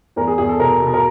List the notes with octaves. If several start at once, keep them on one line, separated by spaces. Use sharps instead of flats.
E2 A#4
G#4
E2 G#4
A4
B2 A#4
B2
A#4